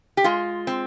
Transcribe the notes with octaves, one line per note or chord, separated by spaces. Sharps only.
G4
G#3 F4
C4